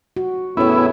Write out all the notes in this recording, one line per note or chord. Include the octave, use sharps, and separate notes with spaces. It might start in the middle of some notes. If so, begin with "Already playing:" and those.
F#4
E2 A2 B3 C#4 E4 C#5